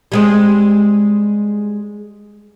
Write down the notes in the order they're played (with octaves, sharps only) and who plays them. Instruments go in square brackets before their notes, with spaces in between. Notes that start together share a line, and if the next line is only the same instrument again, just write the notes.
[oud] G3 G#3 C4